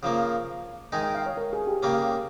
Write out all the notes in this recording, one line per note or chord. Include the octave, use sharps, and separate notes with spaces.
C#3 F3 A#3
D#3 G#3 D#4 G#5
G5
F5
C#5
A#4
G#4
G4
C#3 G3 A#3 C#4